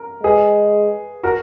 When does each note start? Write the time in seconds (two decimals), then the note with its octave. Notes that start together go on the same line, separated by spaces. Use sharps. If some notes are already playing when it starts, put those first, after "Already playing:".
Already playing: A#4
0.23 G#3 G#4 B4
1.23 F#4 A#4